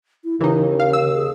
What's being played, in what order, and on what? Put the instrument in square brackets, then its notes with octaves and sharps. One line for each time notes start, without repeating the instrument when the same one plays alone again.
[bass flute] E4
[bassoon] D#2 [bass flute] C#3 [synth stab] E3 D#4
[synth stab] F5
E6
[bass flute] G#4